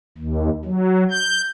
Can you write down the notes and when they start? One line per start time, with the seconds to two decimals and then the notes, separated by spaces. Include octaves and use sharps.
0.18 D#2
0.65 F#3
1.11 G6